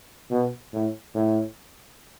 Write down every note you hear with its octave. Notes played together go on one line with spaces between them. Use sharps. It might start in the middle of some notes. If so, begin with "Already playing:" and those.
B2
A2
A2